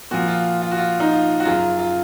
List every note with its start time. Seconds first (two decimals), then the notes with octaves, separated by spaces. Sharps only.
0.11 A#2 F3 F#4
0.28 F4
0.62 F4
0.71 F#4
0.78 F4
1.00 D#4
1.12 F4
1.40 F#4
1.45 F#2 C#3 F#3 F4
1.79 F4